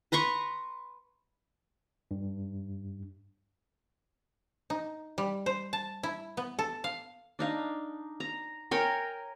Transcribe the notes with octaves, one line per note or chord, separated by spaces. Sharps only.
B4 A#5 C6 C#6
G2
D#4
G3
C5
A5
E4
B3
A4
F5
D4 D#4 F5
A#5
A#4 C#5 G5 G#5